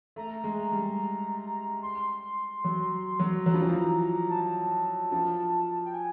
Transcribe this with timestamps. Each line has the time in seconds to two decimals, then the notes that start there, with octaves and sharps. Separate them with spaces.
0.16 A3 A#5
0.44 G#3
0.72 G3
1.82 C6
2.64 F#3
3.20 F#3
3.46 F#3 A#5
3.54 F3 B5
3.62 E3 A#5
3.69 F3
4.30 A5
5.12 F3
5.85 G5
5.94 G#5